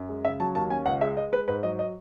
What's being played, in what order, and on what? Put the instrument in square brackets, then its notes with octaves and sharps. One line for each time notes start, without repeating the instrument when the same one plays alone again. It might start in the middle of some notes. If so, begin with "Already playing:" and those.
Already playing: [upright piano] F#2
G#3
C#3 E5
F#3 A5
D#2 A5
C#4 G#5
C#2 F#5
G#3 E5
G#3 D#5
G#3 B4
G#2 B4
F#3 D#5
D#5